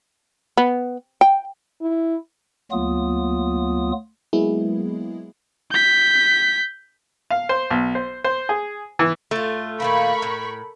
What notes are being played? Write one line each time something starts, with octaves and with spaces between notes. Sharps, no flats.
B3
G5
E4
D2 F#3 A#3 B3 F4 D#6
F#3 G#3 A#3 B3 E4 G#4
G6 B6
F5
C5
B1
C5
C5
G#4
E3
A2 A3 F4
A#2 D#3 A#3 A#4 B5 C#6
A2